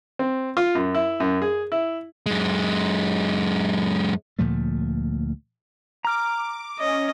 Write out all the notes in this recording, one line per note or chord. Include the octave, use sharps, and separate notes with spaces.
C4
F4
F#2
E4
F#2
G#4
E4
F#2 G#3
D2 A#2 F3 A3
A#5 D6 F6
C#4 D#5